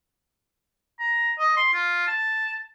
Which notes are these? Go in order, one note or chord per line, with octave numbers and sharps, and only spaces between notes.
A#5
D#5
C6
F4
A5